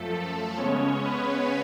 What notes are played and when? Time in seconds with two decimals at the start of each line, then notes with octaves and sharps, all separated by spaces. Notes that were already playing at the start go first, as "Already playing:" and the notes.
Already playing: F#2 F3 A3 A4
0.57 C#3 G#3 B3 C#4 C#5
1.04 B3 B4